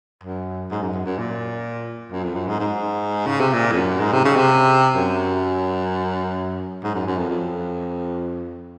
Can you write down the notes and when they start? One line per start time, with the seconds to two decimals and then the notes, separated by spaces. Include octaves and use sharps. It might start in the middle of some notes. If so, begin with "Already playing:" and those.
0.23 F#2
0.71 G#2
0.82 F#2
0.94 F#2
1.06 F#2
1.18 A#2
2.11 F#2
2.24 F2
2.35 F#2
2.48 G#2
2.59 G#2
3.26 C#3
3.40 C3
3.53 A#2
3.72 F2
3.77 F#2
4.00 G#2
4.13 C3
4.25 C#3
4.36 C3
4.95 F#2
6.83 G#2
6.94 F#2
7.07 F#2
7.18 F2
7.30 F2